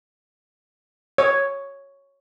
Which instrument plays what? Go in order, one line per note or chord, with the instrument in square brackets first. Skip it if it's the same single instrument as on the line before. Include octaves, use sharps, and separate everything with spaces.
[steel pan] C#5